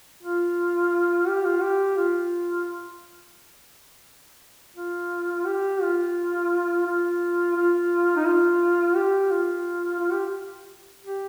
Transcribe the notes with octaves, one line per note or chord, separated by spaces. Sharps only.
F4
G4
F4
G4
F4
F4
G4
F4
F4
F4
D#4
F4
G4
F4
F4
G4
G4